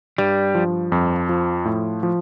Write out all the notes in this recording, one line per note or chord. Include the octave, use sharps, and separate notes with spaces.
G2 G3
F3
F2
F3
A2
F3